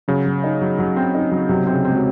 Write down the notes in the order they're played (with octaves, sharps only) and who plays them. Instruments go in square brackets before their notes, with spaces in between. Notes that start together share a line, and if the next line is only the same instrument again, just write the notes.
[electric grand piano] C#3 [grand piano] F#3
[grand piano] F#3
D#4
F#3
F#3
C4
D#4
F#3
[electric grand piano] C3 [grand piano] F#3
[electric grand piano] C3 [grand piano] C4
[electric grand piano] C#3
[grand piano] C4
[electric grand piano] G#3
F#3